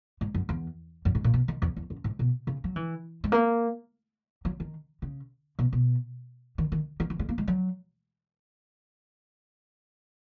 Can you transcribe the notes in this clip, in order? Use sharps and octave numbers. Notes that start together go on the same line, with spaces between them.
G#2
F#2
E2
F#2
G#2
A#2
B2
D#3
E2
E2
F#2
G#2
B2
C#3
F#3
E3
G#3
A#3
F#3
D#3
C#3
B2
B2
D#3
D#3
D#3
E3
G#3
A#3
G#3
F#3